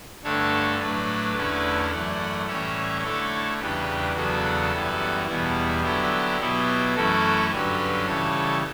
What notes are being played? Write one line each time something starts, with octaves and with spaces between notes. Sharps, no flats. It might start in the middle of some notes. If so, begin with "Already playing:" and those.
G2 D3 A3 D4 A4 C#5
A2 F#3 A3 D4 B4 D5
E2 D3 A3 C#4 E4
F#2 E3 A3 D5 F#5
A2 E3 G3 C#4 C#5 E5
D3 A3 E4 A4 C#5
E2 C#3 E3 G3 D4 G4 B4
E2 C#3 F#3 B3 D4 F#4 A4
F#2 E3 G3 B3
E2 B2 G3 B3 E4
D3 F#3 B3 E4 G4
B2 F#3 B3 E4
F#2 E3 A3 C#4 E4 F#4 A4
G2 D3 F#3 C#4 G4 B4
C#3 E3 G3 A4 C#5